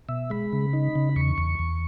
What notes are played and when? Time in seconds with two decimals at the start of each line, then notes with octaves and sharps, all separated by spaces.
0.09 B2 E5
0.30 G#3 B5
0.53 C#3
0.73 D#4
0.95 C#3
1.16 E2 C#6
1.38 E2
1.59 E2